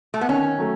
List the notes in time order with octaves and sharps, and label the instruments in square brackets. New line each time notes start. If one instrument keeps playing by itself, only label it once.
[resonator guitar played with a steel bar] A3
B3
[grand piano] D#3 [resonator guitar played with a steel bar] C#4
[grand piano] F#3 A3